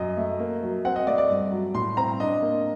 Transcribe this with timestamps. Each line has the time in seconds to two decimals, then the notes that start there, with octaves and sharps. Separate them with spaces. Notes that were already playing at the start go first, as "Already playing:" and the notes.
Already playing: F#2 F#3 D#5
0.17 A3
0.40 A#3
0.63 F#3
0.85 C4 F#5
0.96 D#5
1.07 A3 D5
1.18 D5
1.30 G2
1.52 F#3
1.75 A2 C6
1.97 C4 A#5
2.20 D4 D#5
2.42 A#3